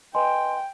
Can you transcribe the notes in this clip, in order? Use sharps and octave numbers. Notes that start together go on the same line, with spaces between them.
B4 D#5 G5 G#5 C6